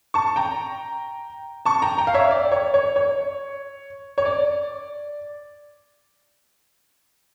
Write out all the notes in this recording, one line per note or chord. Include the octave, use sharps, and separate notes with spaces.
A5 C#6
G5 A#5
A5 C#6
G5 A#5
G5 A#5
F5
C#5 E5
D5
C#5
C#5
C#5
C#5
D5